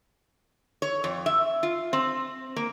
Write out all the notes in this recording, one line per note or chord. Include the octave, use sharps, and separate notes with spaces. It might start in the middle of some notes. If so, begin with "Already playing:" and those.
C#5
F2
E5
F4
C4
A#3